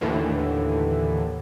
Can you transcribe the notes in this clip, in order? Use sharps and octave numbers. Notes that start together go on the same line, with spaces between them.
D#2 A2 D3 E3